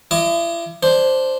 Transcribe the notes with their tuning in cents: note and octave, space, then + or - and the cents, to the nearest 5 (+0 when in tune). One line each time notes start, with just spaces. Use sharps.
E4 +40 D#5 +0 D6 +10
D4 +0 C5 +0